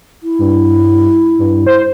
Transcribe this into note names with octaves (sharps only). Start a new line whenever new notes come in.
E4
G2
G2
C5